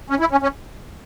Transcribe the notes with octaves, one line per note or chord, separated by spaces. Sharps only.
C#4
E4
C#4
C#4